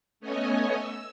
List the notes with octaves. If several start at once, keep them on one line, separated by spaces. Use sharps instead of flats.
A3 B3 C#4 C#5 D#5 G#5
E6